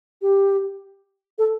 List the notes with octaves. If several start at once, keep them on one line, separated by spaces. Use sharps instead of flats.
G4
A4